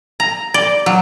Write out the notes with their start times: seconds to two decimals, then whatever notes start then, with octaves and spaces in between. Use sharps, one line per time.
0.20 A#5
0.54 D5
0.86 F#3